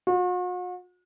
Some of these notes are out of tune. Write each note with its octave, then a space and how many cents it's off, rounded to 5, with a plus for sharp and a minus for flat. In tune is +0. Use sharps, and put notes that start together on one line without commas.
F#4 -45